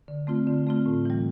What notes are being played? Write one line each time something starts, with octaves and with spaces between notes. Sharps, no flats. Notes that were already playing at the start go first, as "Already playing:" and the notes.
D3
A3 C4 F4
D3
A3 C4 F4
A2
E3 G3